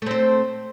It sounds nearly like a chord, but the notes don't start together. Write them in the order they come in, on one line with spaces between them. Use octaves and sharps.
A3 C4 C5